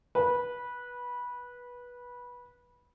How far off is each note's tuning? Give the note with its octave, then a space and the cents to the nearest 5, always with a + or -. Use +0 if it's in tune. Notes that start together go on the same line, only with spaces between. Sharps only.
B4 -15